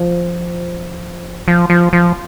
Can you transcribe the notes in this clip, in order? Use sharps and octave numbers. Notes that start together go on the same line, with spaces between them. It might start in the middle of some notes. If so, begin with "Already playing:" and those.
Already playing: F3
F3
F3
F3